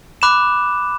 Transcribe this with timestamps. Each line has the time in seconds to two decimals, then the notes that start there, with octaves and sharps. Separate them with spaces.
0.22 B5 D6 F#6 E7